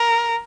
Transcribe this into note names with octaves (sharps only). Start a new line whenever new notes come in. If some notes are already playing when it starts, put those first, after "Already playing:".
Already playing: A#4